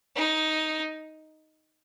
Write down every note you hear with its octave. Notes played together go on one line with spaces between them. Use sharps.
D#4